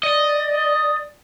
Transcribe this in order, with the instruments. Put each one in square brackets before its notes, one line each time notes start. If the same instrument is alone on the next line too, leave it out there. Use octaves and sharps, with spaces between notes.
[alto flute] D5 [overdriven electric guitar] D#5